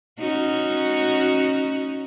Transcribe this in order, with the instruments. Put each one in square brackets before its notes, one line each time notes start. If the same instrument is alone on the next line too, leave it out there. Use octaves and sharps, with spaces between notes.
[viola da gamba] C#4 D#4 F#4